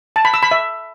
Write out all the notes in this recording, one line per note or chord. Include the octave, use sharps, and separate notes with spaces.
A5
B5
E6
B5
E5